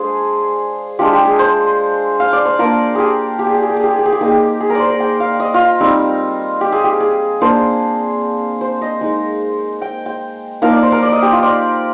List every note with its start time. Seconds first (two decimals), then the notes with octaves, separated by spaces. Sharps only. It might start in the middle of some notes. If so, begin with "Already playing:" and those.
Already playing: G#3 D4 F4 G#4 C5
0.99 G#3 D4 F4 G4
1.13 G4
1.25 G#4
1.39 C5
2.20 F5
2.33 D5
2.45 C5
2.59 A#3 D4 F4 A#4
2.95 G4 G#4
3.39 G4
3.47 G#4
3.54 G4
3.62 G#4
3.70 G4
3.77 G#4
3.83 G4
3.91 G#4
3.99 G4
4.06 G#4
4.12 G4
4.20 A#3 D#4 G#4
4.28 G4
4.60 G#4
4.70 A#4
4.75 C5 D5
4.90 A#4
5.00 G5
5.20 F5
5.40 D#5
5.54 F4
5.80 G3 C4 D#4
6.61 G4
6.72 G#4
6.84 G4
7.00 G#4
7.41 A#3 D4 F4 C5
8.61 C5
8.81 D#5
9.01 G#3 D#4
9.81 G5
10.06 G5
10.62 F3 A#3 D#4 F5
10.72 D5
10.82 C5
10.92 A#4
11.02 D5
11.12 D#5
11.22 G4
11.33 F4
11.43 D5